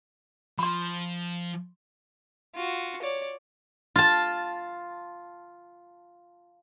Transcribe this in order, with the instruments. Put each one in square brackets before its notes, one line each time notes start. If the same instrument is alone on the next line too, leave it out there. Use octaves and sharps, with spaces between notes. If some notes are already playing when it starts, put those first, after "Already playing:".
[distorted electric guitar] F3 [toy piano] B5 C6
[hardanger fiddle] F4 F#4
C#5 D5
[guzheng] F4 A5